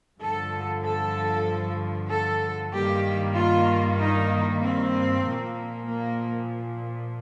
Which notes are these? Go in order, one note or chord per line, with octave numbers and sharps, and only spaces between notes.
G2 D3 F3 A4
A4
A4
G2 D#3 G3 A#3 G4
F4
D#4
C4
A#2 F3 A#3
A#3